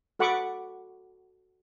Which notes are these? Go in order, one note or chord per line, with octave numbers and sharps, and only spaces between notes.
F#4 A4 F#5 B5 C#6 D6